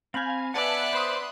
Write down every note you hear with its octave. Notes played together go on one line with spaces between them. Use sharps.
C4 F5 G#5 B5 G6
B3 D5 E5 F#5 G#5 A5 E6 F#6
C5 B5 C6 D#6